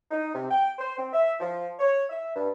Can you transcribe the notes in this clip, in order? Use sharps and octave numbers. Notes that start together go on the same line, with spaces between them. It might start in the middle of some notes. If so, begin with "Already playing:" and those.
D#4
C3
G5
C5
C4
E5
F3
C#5
E5
G2